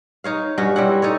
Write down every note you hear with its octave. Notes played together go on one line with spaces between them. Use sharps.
D#4 C#5 F5
G2 C#4 F#4
G3 C4 E4 F#5
D#4 A4 C#5